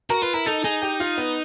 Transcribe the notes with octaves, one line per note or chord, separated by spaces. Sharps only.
F#4 A#4
F4 B4
E4 A#4
D#4 A4
D#4 G#4
G4
F4
B3